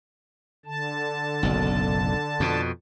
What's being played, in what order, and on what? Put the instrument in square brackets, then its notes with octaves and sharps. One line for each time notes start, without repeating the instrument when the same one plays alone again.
[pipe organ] D3 A5
[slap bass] F#1 B1
F2 B2